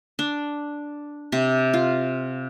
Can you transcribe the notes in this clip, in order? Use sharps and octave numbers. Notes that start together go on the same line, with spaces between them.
D4
C3
F4